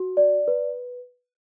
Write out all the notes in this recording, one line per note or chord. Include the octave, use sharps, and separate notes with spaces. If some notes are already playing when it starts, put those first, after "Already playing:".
Already playing: F#4
D5
B4